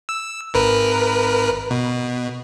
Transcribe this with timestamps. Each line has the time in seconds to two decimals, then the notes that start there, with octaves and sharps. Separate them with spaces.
0.09 E6
0.54 G#1 A#4 B4
1.70 B2